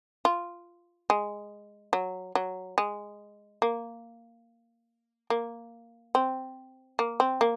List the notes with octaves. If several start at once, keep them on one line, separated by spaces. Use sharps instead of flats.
F4
G#3
F#3
F#3
G#3
A#3
A#3
C4
A#3
C4
A#3